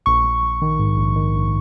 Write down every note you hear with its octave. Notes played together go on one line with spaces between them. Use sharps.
A#1 C#6
A#1
A#1
D#3
G#2
A#1
D#3
A#1